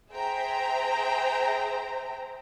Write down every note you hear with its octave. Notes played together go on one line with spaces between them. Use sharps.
G#4 C5 E5 G5 A#5